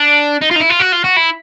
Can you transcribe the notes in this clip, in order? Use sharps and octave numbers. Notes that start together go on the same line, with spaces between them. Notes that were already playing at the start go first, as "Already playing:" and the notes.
Already playing: D4
D#4
F4
D#4
E4
F4
F#4
F4
F#4
E4